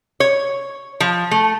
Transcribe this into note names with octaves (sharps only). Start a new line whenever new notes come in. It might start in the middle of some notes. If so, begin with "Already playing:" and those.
C#5
F3
A3